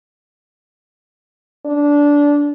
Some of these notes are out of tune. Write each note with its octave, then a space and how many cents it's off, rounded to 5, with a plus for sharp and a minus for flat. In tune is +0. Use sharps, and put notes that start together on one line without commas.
D4 -15